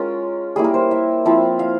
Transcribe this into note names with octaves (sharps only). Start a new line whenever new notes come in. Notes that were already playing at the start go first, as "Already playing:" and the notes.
Already playing: G#3 C#4 F4 A#4
G3 A#3 E4 G#4
A#4
C5
E5
F3 C4 E4
F5